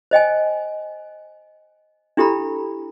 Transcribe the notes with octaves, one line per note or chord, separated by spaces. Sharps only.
C5 D#5 G5 G#5
D4 E4 G4 A4 A#5 B5